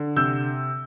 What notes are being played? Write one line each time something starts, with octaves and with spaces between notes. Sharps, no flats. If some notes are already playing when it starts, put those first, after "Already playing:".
Already playing: D3
C3 E6 G6